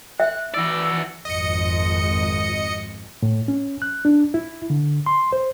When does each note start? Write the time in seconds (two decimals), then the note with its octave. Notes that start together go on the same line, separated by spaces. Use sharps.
0.20 E5 F#6
0.54 E3 F#4 D5 E6
1.25 G#1 F2 D#5 C#7
3.23 A2
3.48 C#4
3.82 F#6
4.05 D4
4.34 E4
4.70 D3
5.06 C6
5.33 C5